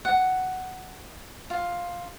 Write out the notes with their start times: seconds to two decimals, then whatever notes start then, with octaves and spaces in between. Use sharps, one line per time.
0.05 F#5
1.50 F4